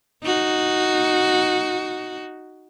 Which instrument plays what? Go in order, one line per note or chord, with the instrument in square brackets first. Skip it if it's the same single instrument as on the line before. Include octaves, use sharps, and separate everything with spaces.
[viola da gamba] D#4 F#4